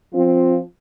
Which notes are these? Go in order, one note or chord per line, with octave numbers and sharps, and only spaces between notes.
F3 C4 F4